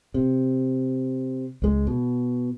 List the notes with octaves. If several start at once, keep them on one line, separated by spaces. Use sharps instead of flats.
C3
C#2 G#3
B2